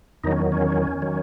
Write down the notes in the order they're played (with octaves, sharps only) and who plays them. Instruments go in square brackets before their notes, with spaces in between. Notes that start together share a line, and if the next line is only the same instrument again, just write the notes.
[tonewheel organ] E2 D#3 F#3 D#4
C#4
C#4
D#3 F#3